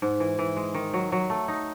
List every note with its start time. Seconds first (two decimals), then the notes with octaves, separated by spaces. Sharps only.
0.02 G#2
0.20 E3
0.39 E3
0.56 G#3
0.74 D#3
0.94 F#3
1.12 F#3
1.30 A3
1.48 D#4